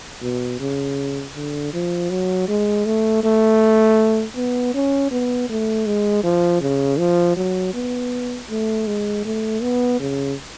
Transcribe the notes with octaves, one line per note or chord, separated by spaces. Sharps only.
B2
C#3
D3
F3
F#3
G#3
A3
A3
B3
C#4
B3
A3
G#3
F3
C#3
F3
F#3
B3
A3
G#3
A3
B3
C#3